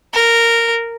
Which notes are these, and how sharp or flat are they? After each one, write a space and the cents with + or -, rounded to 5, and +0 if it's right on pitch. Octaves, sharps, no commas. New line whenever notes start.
A#4 -10